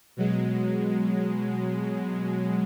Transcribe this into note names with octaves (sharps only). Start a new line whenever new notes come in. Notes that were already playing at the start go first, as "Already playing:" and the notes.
B2 F#3 G#3